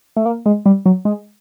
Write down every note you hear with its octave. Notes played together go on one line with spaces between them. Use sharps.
A3
A#3
G#3
G3
F#3
G#3